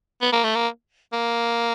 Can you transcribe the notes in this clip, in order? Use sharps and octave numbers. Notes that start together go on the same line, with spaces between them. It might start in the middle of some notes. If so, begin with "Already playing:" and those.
B3
A#3
A3
A#3
A#3